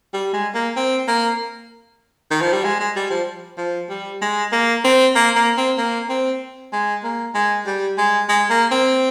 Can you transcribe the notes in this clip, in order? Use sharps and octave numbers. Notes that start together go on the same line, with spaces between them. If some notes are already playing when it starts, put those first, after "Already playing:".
G3
G#3
A#3
C4
A#3
D#3
F3
G3
G#3
G#3
G3
F3
F3
G3
G#3
A#3
C4
A#3
A#3
C4
A#3
C4
G#3
A#3
G#3
G3
G#3
G#3
A#3
C4